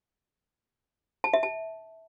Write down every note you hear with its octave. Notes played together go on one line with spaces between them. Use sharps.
A5
E5
A5